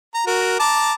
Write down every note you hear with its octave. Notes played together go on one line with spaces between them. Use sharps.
A#5
F#4 A#4
A5 A#5 D6